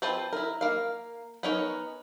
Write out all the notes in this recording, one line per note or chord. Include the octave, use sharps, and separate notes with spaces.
C4 F4 B4 C5 A5
E4 A#4
A#3 F5
B3 C#4 D#4 A#4 C#5